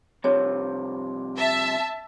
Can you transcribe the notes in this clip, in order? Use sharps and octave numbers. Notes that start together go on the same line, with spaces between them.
G2 C3 F3 C#5
E5 A5